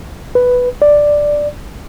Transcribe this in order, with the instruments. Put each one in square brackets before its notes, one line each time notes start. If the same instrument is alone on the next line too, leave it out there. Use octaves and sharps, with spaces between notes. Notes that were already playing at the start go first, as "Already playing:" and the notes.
[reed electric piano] B4
D5